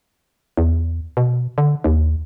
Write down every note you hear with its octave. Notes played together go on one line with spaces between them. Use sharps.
E2
B2
D3
D#2